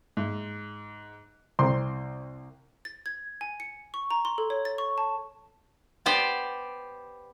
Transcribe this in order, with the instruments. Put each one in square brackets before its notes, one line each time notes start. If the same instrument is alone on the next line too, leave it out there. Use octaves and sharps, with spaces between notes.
[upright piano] G#2
[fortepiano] C2 C4 C6
[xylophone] A6
G#6
G#5
C#7
C#6
A#5
C6
A4
C#5
A6
C#6
A5
[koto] B3 G4 C5 D5